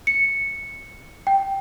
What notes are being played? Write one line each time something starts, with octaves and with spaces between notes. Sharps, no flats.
C#7
G5